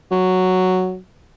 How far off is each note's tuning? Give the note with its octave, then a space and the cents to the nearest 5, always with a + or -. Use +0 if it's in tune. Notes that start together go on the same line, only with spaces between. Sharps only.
F#3 +0